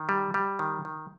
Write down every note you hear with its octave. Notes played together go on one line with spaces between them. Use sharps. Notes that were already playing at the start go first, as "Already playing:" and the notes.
Already playing: D#3
G3
G3
D#3
D#3